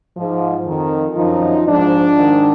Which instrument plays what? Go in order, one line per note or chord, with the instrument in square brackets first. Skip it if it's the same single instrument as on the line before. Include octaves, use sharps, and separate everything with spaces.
[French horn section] G#2 F3
F2 D#3
F#2 F3 D#4
G#2 F3 D4
G#2 D#3